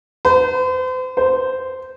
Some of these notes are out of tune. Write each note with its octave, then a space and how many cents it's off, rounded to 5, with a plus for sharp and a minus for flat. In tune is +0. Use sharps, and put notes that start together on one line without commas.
C5 -40
C5 -10